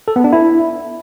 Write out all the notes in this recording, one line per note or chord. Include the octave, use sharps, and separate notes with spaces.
A4
B3
D4
E4